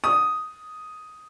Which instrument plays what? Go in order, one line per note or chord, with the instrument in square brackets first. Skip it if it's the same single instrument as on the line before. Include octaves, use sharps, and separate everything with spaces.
[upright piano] D#6